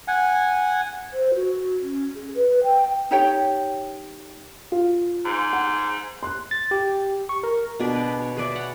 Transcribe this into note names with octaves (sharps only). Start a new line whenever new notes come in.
F#5 G#5
C5
F#4
C#4
G#4
B4
G5
D#4 G4 C#5 G5
F4
G#2
F#5
C6 F#6
A6
G4
C#6
A#4
B2 D4 G#4 D5
B4 D5
C#5
G#4 B4 D5 E5
C#5 F#5 B5